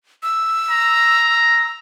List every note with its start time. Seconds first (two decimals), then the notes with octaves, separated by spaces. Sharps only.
0.23 E6
0.71 A#5